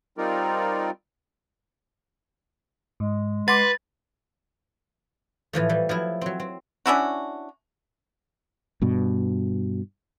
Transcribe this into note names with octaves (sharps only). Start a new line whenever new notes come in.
G3 C4 D#4 F4 A#4 D5
G#2 G#3
B4 F#5 C6 D6 A6
A2 E3 F3 A3
E3 G3
F3 F#3 E4
F#3 C4
C4
C#4 D4 E4 F#4
G2 B2